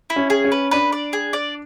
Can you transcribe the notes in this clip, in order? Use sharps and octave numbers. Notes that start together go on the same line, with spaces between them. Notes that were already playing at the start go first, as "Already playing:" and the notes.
E4
C#4
G#4
C#4
B4
D4 B4
D5
G#4
D5